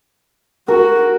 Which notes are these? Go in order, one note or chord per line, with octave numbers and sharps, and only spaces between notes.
F#4 A#4